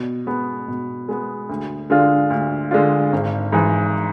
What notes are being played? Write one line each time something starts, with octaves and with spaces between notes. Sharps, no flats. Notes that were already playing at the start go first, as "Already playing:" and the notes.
Already playing: B2
G#3 B3
B2
G#3 B3
D2
D3 G#3 D4 F4
D2
D3 G#3 D4 F4
G#1
G#2 E3